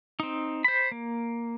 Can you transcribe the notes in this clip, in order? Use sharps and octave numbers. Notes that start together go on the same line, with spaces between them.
C4 D#4
C5 B5
A#3